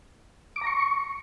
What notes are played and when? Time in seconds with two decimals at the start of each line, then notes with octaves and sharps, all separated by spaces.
0.56 D6
0.61 A#5
0.67 C#6